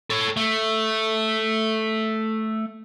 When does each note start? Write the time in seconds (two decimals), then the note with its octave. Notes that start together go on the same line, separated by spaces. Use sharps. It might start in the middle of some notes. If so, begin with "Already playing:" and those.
0.10 A4 C#5
0.37 A3